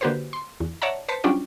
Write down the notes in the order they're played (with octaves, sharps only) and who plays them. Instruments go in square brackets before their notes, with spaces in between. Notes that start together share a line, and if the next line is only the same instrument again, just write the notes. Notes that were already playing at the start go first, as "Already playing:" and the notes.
[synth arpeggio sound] D3 A#3 F#4 G4 B4 C5
C6
E2
C#5 D5 E5 F#5 A5 A#5
B4 C5 A5 B6 C#7
F#3 G3 C#4 D4 F4 D5